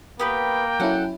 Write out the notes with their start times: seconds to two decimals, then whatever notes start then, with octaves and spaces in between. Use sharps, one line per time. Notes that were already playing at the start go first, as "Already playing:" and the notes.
0.19 A#3 B3 G4 B4 G5
0.80 F#3 C#4 E4 A4 F#5